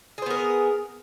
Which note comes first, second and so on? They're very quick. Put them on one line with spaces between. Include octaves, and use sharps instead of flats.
G#4 C5 B3 A#4